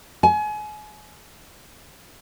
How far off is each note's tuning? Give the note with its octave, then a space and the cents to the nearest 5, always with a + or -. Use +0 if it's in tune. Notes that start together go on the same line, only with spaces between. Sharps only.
G#5 +30